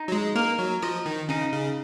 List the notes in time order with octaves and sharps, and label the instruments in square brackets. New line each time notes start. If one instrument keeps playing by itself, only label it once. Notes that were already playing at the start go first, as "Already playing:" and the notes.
Already playing: [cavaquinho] D#4
[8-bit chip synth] F#3
G#3
[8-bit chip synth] A#3 [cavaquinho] A#4
[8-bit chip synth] F#3
[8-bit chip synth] F3 [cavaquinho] D#5
[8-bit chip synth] D#3
[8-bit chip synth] C#3 [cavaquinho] D#4
[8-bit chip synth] C#3